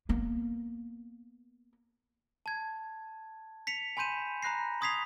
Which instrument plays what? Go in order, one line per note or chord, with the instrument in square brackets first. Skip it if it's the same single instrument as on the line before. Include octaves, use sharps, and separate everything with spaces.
[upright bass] A#3 B3
[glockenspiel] A5 G#6
B6 C#7 F7
G#5 B5 C6 G6 D#7 E7
A#5 B5 F#6 A#6 C7
C6 D#6 G#6 B6 C7 F7